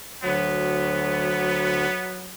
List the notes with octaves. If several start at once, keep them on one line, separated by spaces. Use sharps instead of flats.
D2 F#3 B3